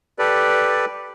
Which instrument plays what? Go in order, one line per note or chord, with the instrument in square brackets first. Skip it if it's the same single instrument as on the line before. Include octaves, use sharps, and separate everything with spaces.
[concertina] G4 A4 B4 D5